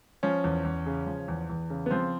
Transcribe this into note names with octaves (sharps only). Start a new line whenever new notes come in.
F3 C#4
E2
E2
C#3
F3
E2
E2
C#3
B3
F3 C4